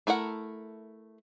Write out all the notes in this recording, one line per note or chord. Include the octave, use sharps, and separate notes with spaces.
A3 E4 A#4 F#5